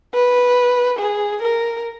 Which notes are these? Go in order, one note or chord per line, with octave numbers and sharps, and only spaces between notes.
B4
G#4
A#4